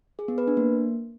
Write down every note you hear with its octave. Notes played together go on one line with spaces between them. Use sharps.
G#4
B3
B4
D4
A#3